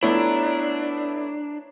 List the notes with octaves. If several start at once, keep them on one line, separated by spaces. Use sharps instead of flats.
A3 B3 D4 E4 C#5 A#5